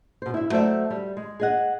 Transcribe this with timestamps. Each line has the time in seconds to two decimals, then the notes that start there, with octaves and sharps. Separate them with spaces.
0.22 B2 C5
0.34 E4 E5
0.50 F#3 A3 C5 D5 E5
0.90 G3
1.17 G#3
1.40 G#4 D#5 F#5